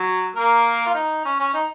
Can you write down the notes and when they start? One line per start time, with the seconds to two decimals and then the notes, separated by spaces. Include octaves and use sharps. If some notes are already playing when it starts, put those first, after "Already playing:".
Already playing: F#3 F#4
0.36 A#3 A#4
0.86 F4
0.94 D#4
1.25 C#4
1.39 C#4
1.54 D#4